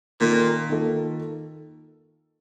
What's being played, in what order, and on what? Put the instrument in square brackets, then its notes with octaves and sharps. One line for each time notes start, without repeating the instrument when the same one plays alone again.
[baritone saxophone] A#2 [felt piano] D#3 A#3 F4 A4
[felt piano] D#3 A#3 F4 A4